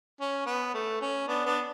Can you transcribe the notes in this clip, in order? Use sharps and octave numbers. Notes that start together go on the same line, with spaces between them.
C#4
B3
A3
C#4
B3 D4
B3 D4